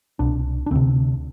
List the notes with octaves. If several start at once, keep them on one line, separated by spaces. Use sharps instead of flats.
C2 B2 D4
D4
D2 C3 C4